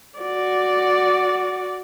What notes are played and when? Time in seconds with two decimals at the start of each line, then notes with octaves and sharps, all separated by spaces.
0.19 F#4 D5